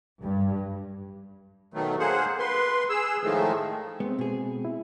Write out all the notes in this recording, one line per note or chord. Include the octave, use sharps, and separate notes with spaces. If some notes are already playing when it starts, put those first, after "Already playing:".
G2
B2 D#3 F#3 A3
A#3 G#4 C5 F#5
B4 C6
G#4 E6
A2 D#3 F3 G#3 A3
G#3 B3 C4
B2 G#4
E4